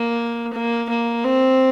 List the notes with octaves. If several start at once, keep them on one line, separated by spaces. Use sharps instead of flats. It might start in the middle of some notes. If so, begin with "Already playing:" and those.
Already playing: A#3
A#3
A#3
C4